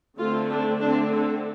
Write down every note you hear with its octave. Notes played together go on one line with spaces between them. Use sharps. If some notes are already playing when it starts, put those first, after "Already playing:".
D3 A3 C4 F4
D4
D3 A3 C4 D4
A4